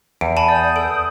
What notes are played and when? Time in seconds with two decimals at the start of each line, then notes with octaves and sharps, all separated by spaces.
0.21 E2 D7
0.37 G#5 A5 B5
0.48 D5 D#6 G6
0.76 A4 D7